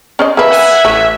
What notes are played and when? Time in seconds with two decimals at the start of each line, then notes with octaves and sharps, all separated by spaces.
0.19 C#4 C5 D#5
0.37 A#3 B4 E5
0.50 F#5 G#5
0.85 A1 A3